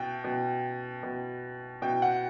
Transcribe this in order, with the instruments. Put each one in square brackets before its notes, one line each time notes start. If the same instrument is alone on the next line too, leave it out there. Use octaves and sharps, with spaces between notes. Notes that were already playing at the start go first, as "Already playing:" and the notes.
Already playing: [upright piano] B2 G5
B2
B2
B2 G5
F#5